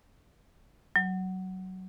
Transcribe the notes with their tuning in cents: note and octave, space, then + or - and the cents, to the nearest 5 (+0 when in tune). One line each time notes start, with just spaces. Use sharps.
F#3 +15